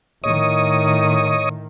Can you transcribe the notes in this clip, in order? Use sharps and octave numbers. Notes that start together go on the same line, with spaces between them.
A2 D#3 C#5 D#5 D#6